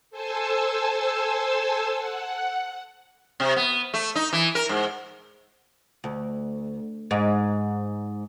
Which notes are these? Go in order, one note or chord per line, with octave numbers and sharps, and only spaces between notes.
A4 C5 G#5 A5 E6
F#5
C3
B3
A3
D#4
E3
A#4
G#2
D2
G#2